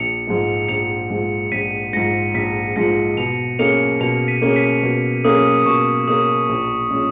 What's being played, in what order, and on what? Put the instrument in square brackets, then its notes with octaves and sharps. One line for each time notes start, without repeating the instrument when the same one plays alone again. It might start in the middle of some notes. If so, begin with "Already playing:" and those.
Already playing: [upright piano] A#1 [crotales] C#7 F7
[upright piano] G#2 F3 G#3
[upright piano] A#1 [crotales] C#7 F7
[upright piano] G#2 F3 G#3
[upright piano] A#1 [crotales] B6 D#7
[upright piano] G#2 F3 G#3 [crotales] A#6 C#7
[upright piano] A#1 [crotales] B6
[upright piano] G#2 F3 G#3 [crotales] A#6 C#7
[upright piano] B2 [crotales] C#7 F7
[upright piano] A#3 C#4 G#4 [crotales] C#7 F7
[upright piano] B2 [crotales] C#7 F7
[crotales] B6 D#7
[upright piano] A#3 C#4 G#4
[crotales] B6 D#7
[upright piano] B2
[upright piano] A#3 C#4 G#4 [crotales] D#6
[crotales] D#6
[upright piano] B2 [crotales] C#6
[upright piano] A#3 C#4 G#4 [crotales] D#6
[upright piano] A#1
A#2 G#3 C#4